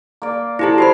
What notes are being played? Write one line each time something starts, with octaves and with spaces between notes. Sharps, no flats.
A#3 D5
F3 E4 G4 A4 A5
E4 F#4 C5 B5